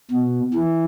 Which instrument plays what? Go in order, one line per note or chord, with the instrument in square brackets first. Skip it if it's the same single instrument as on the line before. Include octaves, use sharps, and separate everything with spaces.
[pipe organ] B2
E3